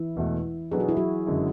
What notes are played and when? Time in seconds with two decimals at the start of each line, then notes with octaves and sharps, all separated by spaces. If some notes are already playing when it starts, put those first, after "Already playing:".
Already playing: E3 E4
0.16 E1 E2 B2 A3
0.71 B2 F#3 B3 D4 G#4 A4
0.80 F#4
0.89 E4
0.97 F#3 F#4
1.27 F#1 F#2 D3 G#3